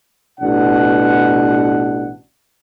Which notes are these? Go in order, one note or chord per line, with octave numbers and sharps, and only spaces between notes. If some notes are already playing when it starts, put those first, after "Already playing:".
A1 B2 D4 F#5